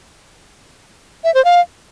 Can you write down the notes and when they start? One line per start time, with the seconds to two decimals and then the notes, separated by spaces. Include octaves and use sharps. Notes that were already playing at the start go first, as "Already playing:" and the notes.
1.24 E5
1.34 C5
1.45 F5